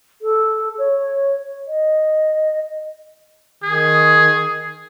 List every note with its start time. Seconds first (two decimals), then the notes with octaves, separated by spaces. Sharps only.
0.22 A4
0.78 C#5
1.68 D#5
3.63 D#3 G#4